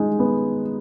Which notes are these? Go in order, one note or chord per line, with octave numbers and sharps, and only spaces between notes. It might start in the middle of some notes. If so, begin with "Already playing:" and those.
Already playing: G#3 D#4
B3